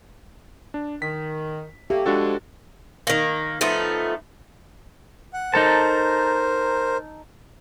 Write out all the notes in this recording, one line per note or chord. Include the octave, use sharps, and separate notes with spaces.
D4
D#3 B6
A3 A#3 G4
F3 G#3 D4 F#4 A4
D#3 A#3
F3 A3 B3 D#4
F#5
D#4 A4 A#4 C5 A5